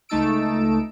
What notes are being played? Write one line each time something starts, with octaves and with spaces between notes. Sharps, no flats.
C#2 A3 D#4 A5 E6 D7